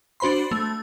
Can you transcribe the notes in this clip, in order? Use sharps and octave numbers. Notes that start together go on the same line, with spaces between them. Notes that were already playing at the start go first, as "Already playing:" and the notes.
D4 F#4 C5 B5 C6
A3